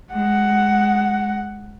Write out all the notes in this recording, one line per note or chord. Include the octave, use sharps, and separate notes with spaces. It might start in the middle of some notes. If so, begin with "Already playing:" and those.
G#3 F#5